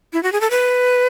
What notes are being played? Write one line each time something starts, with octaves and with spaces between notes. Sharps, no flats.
E4
F#4
G#4
A4
B4